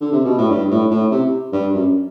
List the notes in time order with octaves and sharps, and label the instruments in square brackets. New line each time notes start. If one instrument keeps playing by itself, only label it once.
[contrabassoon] D3
C3
B2
A2
G2
A2
A2
C3
G2
F#2